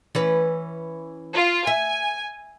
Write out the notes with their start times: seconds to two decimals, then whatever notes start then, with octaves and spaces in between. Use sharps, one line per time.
0.15 E3 C#4 B4
1.34 F4
1.67 E5 G#5